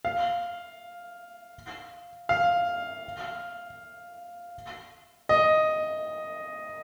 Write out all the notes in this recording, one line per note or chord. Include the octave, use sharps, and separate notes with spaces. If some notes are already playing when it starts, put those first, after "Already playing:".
F5
F5
D#5